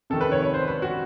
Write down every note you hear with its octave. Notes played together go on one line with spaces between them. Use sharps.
C3 D#3 A4
B4
C#5
C#5
C5
B4
F#4